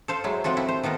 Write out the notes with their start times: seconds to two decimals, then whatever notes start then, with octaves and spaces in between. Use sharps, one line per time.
0.08 A4 C5 F5
0.24 F#3 G#3 E4
0.44 C3 D#3 F3 C4 F#4 A4
0.57 E4
0.69 C5
0.83 D#3 B3 A4 A#4